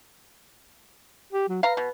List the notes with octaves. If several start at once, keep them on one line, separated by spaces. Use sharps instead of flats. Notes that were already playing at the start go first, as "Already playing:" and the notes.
G4
F#3
B4 F5 A#5
B2